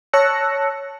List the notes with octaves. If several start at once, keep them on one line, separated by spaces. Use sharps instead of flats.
C#5 A5 E6 F#6 A#6 C#7